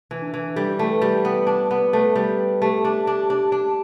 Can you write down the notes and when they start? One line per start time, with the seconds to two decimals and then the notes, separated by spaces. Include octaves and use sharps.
0.11 E3
0.22 D4
0.34 E3
0.56 G3 A4
0.79 A3
0.90 B4
1.02 G3
1.25 B3
1.47 D4
1.71 B3
1.93 A3 B4
2.16 G3
2.62 A3 G4
2.85 D4
3.07 D4
3.30 D4
3.52 D4